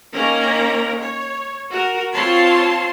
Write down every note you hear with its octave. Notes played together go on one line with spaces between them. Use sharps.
D#3 A#3 C#4 A#4 A#5
C#5
F#4 A#4
C4 F4 C#5 A5 C6